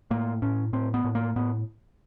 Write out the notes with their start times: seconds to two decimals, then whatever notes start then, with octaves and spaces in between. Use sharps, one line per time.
0.11 A2 A#3
0.42 A2 C#4
0.73 A2 C4
0.94 B3
1.04 A2
1.15 A#3
1.36 A2 B3